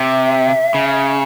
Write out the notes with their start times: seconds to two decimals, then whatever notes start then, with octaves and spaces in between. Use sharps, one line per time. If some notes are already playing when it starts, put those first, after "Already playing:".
Already playing: C3 E5
0.74 C#3